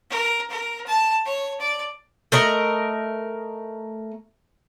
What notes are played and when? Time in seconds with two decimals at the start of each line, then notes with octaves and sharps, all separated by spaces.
0.10 A#4
0.50 A#4
0.86 A5
1.25 C#5
1.60 D5
2.32 A3 A#4 D#5